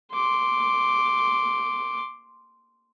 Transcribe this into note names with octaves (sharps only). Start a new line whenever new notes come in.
C6 D6